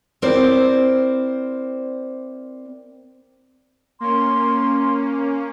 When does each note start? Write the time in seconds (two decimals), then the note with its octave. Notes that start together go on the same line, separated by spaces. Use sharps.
0.22 C4 E4 A#4 C5 D5
4.00 A#3 C#4 C6